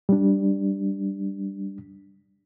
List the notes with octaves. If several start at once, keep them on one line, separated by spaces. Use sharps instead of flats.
G3 D4